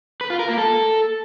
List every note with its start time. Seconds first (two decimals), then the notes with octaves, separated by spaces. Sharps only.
0.21 B4
0.30 F4
0.39 A#4
0.48 A#3
0.58 A4